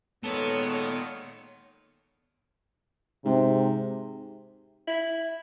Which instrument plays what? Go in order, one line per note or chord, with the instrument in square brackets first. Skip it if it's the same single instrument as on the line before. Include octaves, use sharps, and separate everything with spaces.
[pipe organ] A#2 D#3 [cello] G#3 C#5 [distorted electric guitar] B3 [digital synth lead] A4
[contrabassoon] G#2 [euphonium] C3
[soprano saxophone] E4